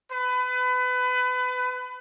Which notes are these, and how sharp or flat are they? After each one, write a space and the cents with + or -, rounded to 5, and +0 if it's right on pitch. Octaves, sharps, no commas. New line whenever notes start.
B4 +25